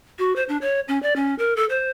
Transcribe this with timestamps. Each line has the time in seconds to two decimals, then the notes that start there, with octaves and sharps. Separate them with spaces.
0.19 F#4
0.36 C5
0.49 D4
0.61 C#5
0.88 C#4
1.03 D5
1.16 C#4
1.39 A#4
1.56 A4
1.70 C5